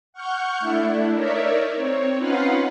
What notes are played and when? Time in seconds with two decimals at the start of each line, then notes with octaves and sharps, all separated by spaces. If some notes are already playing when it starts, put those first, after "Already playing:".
0.13 F#5 C#6 F6 G6
0.59 A3 D4 E4
1.13 D#4 A#4 C#5 D5 E5
1.75 C4 C#5
2.18 C#4 D#4 F4 B4 F5 F#5